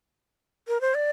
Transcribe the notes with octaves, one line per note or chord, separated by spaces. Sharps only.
A#4
C5
D5